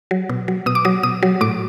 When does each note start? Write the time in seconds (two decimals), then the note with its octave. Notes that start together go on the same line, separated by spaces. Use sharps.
0.11 F#3
0.29 B2
0.48 F#3
0.66 B2 D#6
0.75 D6
0.85 F#3 D#6
1.03 B2 D#6
1.23 F#3
1.41 A2 D6